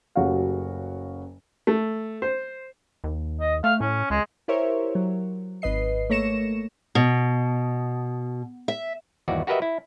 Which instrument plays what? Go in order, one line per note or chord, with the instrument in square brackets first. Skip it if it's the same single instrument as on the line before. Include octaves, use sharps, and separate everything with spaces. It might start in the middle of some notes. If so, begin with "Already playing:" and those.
[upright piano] F#1 C#3 A3 F#4 G4 F5
[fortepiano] A3
C5
[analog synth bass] D#2
[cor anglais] D#5
[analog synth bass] A3 [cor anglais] F5
[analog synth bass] A2 [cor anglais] C#4
[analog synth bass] C#2 [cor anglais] G#3
[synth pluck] E4 G4 A#4 C5 C#5 E5
F#3
G#1 B4 D#5 C7
A3 A#3 C#5 A#6 C#7 E7
[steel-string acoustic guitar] B2
E5
[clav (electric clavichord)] G1 D#2 E3 F#4 D5
F#4 G4 A#4 B4 D#5 E5
E4